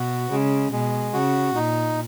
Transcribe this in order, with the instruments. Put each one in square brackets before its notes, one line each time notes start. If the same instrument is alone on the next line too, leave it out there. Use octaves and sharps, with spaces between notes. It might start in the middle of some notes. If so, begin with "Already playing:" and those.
Already playing: [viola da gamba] B2 [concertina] F#4
[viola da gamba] C#3 [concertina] G#3
[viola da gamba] B2 [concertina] G#3
[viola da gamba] C#3 [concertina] F#4
[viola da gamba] A#2 [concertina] D#4